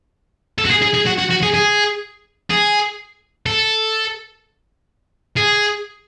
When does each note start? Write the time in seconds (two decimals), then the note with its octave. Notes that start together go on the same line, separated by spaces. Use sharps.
0.58 A4
0.65 F#4
0.70 G#4
0.82 G#4
0.94 G#4
1.06 F#4
1.18 F#4
1.30 F#4
1.43 G#4
1.54 G#4
2.50 G#4
3.46 A4
5.37 G#4